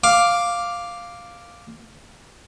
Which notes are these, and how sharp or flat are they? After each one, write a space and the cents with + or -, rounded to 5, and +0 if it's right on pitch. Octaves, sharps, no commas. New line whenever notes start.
F5 +0 D6 +0